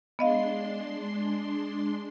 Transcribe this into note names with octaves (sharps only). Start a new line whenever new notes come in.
G#3 B3 D4 D#5 F5 C6